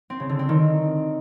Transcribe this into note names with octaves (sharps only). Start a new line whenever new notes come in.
C4
C#3
D3
C4
D#3